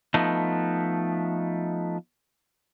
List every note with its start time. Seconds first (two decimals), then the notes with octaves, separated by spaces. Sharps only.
0.14 F3 A3 B3 D#4